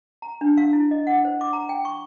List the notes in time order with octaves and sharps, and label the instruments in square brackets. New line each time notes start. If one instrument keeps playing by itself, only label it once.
[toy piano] A#5
D4
F5
E4
D#5
F#5
C5
D6
A#5
G5
C#6